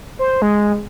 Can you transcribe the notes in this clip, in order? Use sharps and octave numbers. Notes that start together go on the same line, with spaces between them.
C5
G#3